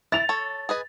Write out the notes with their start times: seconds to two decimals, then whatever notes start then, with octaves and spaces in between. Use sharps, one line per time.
0.12 E4 A6 F7
0.29 A4 C#5
0.69 G#4 B4 D#5